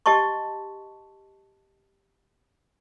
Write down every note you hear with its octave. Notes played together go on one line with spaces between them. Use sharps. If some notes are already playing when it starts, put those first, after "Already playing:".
G4 D#5 A5 C6 C#6